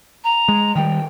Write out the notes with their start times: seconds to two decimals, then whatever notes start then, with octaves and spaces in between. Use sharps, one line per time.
0.24 A#5
0.48 G#3
0.76 D#3 G3 G5